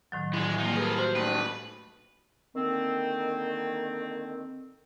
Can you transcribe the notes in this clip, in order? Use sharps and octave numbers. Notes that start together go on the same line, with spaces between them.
A2 D#3 F#3
G2 E3 G#3
F3 G3 A#3 G4
G#4 A#4 B4
F#4 C5
D#3 A3 B4
D3 D#3 A#3 C4